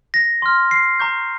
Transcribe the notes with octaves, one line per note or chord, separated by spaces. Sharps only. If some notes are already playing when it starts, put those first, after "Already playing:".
A#6
C6 F6
C7
A#5 C#6 G6